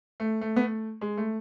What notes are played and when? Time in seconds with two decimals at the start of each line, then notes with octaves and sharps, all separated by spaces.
0.20 A3
0.41 A3
0.56 B3
0.63 A3
1.01 G#3
1.17 A3